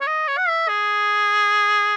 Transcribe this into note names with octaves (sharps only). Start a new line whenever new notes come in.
C#5
D#5
C#5
F#5
E5
G#4